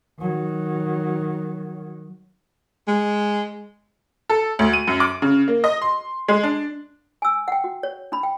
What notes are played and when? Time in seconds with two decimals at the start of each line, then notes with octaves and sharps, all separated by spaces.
0.20 D#3 F#3
2.88 G#3
4.30 A4
4.59 D2
4.73 D#7
4.87 F#2
5.00 D6
5.22 C#3
5.48 A#3
5.64 D#5
5.82 C6
6.28 G#3
6.43 D4
7.22 G#5 E6
7.48 F#5 G5
7.64 F#4
7.83 C#5
8.12 D4 B5
8.23 G5